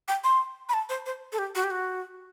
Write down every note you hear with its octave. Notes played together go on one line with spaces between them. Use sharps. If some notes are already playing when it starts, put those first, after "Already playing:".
G5
C6
B5
A5
C5
C5
A4
G4
F#4
G4
F#4